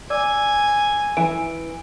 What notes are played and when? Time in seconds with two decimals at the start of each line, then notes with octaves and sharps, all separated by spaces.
0.10 D5 G#5 D6 E6
1.17 E3 D7